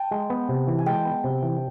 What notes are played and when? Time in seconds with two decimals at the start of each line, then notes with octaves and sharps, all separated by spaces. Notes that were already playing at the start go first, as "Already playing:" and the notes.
Already playing: G5 A5
0.11 G#3
0.30 B3
0.49 C3
0.67 E3
0.79 G#5
0.86 G#3 G5 A5
1.05 B3
1.24 C3
1.43 E3